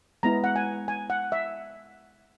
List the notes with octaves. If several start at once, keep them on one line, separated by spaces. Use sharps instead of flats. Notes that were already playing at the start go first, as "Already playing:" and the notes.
G#3 B3 E4 A#5
F#5
G#5
G#5
F#5
E5